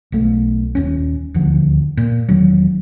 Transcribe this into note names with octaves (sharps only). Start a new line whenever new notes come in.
B1 A3
D#1 C#4
D#1 D2 D3 F3
A#2
E1 D#3 F#3